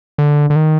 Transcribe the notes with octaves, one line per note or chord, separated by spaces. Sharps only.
D3
D3
D#3